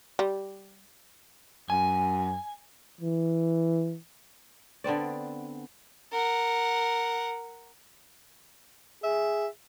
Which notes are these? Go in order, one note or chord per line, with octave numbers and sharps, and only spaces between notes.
G3
F#2 G#5
E3
D3 B3 C4 D5
A#4 F#5
G#4 E5